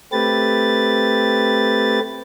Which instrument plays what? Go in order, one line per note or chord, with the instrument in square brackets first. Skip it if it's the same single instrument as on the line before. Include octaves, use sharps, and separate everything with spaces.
[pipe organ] A3 C4 G4 B4 A6